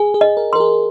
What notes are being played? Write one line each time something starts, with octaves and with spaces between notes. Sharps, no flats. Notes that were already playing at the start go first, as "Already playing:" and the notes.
Already playing: G#4 G#5
G#4
D#5
A#4
A#4 C6
G#4